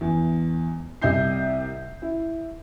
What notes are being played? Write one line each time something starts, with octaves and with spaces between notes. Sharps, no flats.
E2
C2 C3 D#5 E5 G6 C7
E4